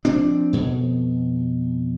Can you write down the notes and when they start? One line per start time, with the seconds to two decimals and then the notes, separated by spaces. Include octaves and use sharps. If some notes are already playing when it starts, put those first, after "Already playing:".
0.05 F3 C4 D4
0.53 F2 B2